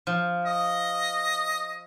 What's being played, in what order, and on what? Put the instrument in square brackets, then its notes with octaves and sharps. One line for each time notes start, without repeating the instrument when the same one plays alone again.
[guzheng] F3
[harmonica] D#5